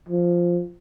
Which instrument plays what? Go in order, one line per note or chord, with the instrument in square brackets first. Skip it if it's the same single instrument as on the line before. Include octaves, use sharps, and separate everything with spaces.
[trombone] F3